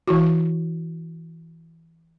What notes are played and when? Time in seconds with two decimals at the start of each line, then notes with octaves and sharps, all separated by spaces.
0.08 E3 E4 F#4